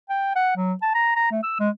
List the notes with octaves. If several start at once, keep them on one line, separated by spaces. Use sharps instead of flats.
G5
F#5
F#3
A5
A#5
A#5
A3
E6
G#3